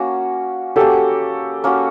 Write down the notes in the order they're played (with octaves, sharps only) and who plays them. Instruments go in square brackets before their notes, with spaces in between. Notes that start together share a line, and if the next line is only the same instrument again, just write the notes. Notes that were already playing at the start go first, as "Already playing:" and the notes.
Already playing: [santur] A#3 C#4 F#4
[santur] A#3 C#4 F#4 [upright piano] G4 A4
[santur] A#3 C#4 F#4